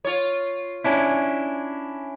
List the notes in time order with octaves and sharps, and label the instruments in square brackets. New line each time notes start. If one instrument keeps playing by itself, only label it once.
[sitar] F4 C#5
[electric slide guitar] C#4 D4 E4